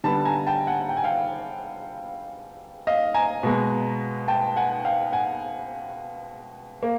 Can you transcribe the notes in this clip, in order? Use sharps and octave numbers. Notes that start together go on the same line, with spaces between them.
D3 G3 B3 A5 B5
G#5 A#5
G5 A5
F#5 G#5
G5
G#5
F5 G5
D#5 F5
G#5 A#5
B2 G#3 B3
G5 A5
F#5 G#5
F5 G5
F#5 G#5
A#3